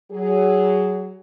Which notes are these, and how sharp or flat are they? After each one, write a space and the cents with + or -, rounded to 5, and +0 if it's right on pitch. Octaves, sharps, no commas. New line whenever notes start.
F#3 +20 G#4 +0